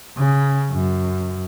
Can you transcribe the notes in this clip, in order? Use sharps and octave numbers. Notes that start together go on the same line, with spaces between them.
C#3
F#2